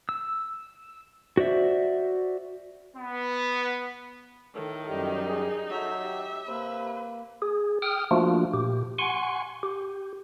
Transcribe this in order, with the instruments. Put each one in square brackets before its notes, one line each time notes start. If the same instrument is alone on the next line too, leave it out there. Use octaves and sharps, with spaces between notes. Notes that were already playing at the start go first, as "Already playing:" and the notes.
[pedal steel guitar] E6
F#4 C5 D5 E5
[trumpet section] B3
[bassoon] A2 [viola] D#3 [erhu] A4
[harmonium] F#2 G3 G4 [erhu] D#4
[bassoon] G#4
[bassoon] F#3 [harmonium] A4 [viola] E5
[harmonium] G4
[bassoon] C3 [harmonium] A#3 [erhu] B4
[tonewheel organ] G#4
G5 D#6 F6
F3 A3 A#3 D4 F4 F#4
A#2 G4
F#5 G#5 C6 C#6
G4